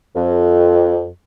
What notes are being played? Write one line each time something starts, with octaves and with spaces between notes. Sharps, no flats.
F2